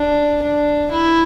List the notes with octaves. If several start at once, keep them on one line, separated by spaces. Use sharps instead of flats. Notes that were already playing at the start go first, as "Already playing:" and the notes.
Already playing: D4
D4
E4